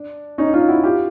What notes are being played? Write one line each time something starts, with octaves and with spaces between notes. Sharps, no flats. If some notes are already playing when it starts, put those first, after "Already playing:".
Already playing: D4
C#4 D#4
D#4 F4
E4 F#4
F4 G4